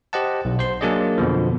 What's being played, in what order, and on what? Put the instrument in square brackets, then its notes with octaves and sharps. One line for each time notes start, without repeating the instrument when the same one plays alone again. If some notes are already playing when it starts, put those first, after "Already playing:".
[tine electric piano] G4 C5 D#5 F#5 A5
B1
C5 C6
F#3 A#3 D4 G#4 D5 D#5
F2 B2 D3 F3